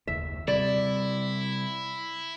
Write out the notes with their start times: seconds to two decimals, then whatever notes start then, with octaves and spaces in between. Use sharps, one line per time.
0.07 F#1 D#2 E5
0.48 C3 G3 E4 D5